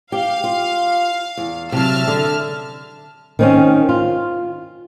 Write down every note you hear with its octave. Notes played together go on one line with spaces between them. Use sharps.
G4 F5
F4
E2
C3 F#3 E5 A5 F6
D3
D#3 C4 C#4
F4